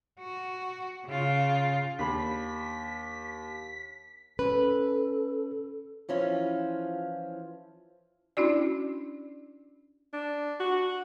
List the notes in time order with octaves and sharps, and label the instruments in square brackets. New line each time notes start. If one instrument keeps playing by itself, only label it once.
[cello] F#4
C#3 F4
[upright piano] D#2 [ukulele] D4 B5 [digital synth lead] B6
[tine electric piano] C#4 [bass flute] A4 [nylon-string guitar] B4
[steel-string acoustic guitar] E3 F3 C#4 F4
[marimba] C#4 D4 E4 F#4 D5
[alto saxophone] D4
F#4